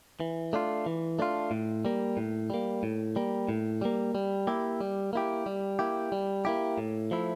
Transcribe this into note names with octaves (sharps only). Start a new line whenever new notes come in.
E3
A3 D4 F4
E3
A3 D4 F4
A2
G3 A#3
A2
G3 A#3
A2
G3 A#3
A2
G3 A#3
G3
A#3 E4 G4
G3
A#3 E4 G4
G3
A#3 E4 G4
G3
A#3 E4 G4
A2
F3 A3 E4